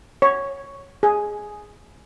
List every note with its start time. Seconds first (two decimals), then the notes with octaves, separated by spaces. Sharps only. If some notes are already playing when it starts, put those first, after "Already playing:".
0.22 C#5
1.03 G#4